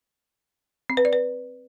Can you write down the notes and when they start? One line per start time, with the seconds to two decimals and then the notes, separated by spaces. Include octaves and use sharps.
0.90 C4
0.97 B4
1.05 D5
1.13 B4